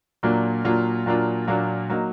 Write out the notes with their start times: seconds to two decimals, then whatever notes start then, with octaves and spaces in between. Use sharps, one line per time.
0.23 A#2 F#3 A#3 D4 F4
0.64 A#2 F#3 A#3 D4 F4
1.06 A#2 F#3 A#3 D4 F4
1.47 A#2 F#3 A#3 D4 F4
1.90 F#3 A#3 D#4